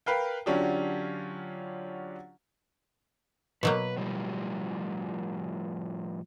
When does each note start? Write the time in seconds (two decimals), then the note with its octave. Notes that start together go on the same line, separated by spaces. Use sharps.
0.06 A#4 B4 F5 G5
0.46 D3 F#3 C#4 D4 F4 G4
3.63 B2 F#3 A#3 B4
3.97 A2 F3 G3